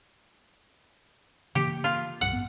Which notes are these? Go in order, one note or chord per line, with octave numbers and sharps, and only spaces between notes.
C#3 E3 A#3 G4
F4
C2 G2 G3 F#5
A1 B3